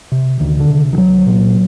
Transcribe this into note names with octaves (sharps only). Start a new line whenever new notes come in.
C3
D2 D#3
D3
C3
D#3
C2 F#3
A#2